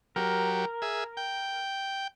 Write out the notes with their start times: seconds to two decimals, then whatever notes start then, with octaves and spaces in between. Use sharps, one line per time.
0.16 F#3 G4 A#4
0.82 G#4 E5
1.17 G5